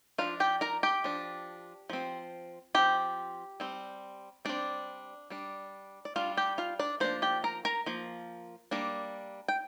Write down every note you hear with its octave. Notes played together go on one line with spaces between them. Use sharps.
F3 D4 F4 F5
G4 G5
A#4 A#5
G4 G5
F3 D4
F3 C4
F3 C4 G4 G5
G3 C4
G3 C4 D4 D5
G3 D4
D5
G3 D4 F4 F5
G4 G5
F4 F5
D4 D5
F3 A#3 D4 C5
G4 G5
A#4 A#5
A#4 A#5
F3 A#3
G3 A#3 D4
G5